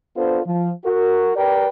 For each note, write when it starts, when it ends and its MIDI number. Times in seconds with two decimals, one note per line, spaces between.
0.16 0.41 59
0.16 0.41 62
0.16 0.41 65
0.16 0.41 69
0.16 0.41 72
0.46 0.71 53
0.85 1.33 66
0.85 1.33 70
1.36 1.67 67
1.36 1.67 70
1.36 1.67 71
1.36 1.67 74
1.36 1.67 79